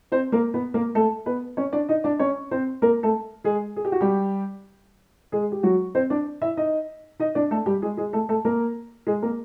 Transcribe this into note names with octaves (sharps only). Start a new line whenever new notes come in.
C4 C5
A#3 A#4
B3 B4
A#3 A#4
A3 A4
B3 B4
C#4 C#5
D4 D5
D#4 D#5
D4 D5
C#4 C#5
C4 C5
A#3 A#4
A3 A4
G#3 G#4
G#4
G4
F#4
G3 G4
G#3 G#4
G4
F#3 F#4
C4 C5
D4 D5
E4 E5
D#4 D#5
D#4 D#5
D4 D5
A3 A4
G3 G4
G#3 G#4
G#3 G#4
A3 A4
A3 A4
A#3 A#4
G#3 G#4
A#3 A#4